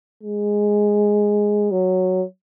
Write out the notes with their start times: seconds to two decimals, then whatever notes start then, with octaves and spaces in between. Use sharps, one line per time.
0.23 G#3
1.72 F#3